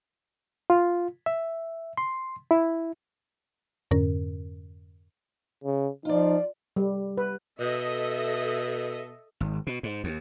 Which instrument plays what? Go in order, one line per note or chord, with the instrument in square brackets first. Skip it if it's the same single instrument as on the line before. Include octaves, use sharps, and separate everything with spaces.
[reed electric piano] F4
E5
C6
E4
[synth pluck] F2 G#2 D3 C#4 A#4
[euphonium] C#3
[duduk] F3 [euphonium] D#4 [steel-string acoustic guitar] F4 D5
[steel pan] G3
B4
[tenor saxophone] B2 [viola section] A4 D#5 E5
[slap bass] G#1
B2
G#2
D#2